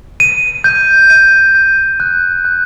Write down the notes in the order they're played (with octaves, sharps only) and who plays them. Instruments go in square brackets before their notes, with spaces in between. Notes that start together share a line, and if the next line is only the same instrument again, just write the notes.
[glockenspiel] D#7
G6
D#7
G6
F#6
F#6